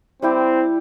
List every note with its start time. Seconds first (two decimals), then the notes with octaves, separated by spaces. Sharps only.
0.22 G3 C4 E4 G4